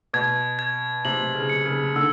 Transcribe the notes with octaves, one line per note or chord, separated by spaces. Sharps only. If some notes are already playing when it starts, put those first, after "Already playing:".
B2 G#6
G#6
C3 F#7
C#3
C#7
C#3
D3 E6